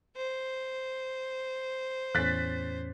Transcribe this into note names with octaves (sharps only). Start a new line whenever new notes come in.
C5
E2 A2 C#4 F#6 A6 B6